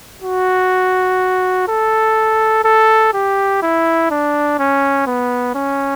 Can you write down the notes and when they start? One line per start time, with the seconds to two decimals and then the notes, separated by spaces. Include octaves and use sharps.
0.22 F#4
1.68 A4
2.64 A4
3.14 G4
3.63 E4
4.11 D4
4.59 C#4
5.07 B3
5.55 C#4